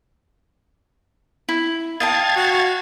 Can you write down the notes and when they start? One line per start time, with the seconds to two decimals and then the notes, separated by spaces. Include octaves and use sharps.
1.49 E4
2.00 D#5 F5 G5 A5 G#6 A6
2.36 F#4